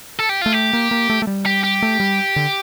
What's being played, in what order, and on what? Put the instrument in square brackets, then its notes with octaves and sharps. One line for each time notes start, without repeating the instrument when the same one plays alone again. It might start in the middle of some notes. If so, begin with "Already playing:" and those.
[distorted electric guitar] A4
G4
[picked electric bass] A3 [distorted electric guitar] F4
[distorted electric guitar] G4
[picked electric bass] A#3
A#3
A3
A3
G3
[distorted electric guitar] G4
G4
[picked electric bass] A3
G3
D3